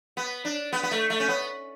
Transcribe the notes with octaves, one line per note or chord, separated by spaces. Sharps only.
B3
D4
B3
B3
A3
A3
C#4
B3